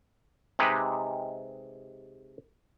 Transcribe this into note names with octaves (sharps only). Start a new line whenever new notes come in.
C3 G#3 D#4 G4 B4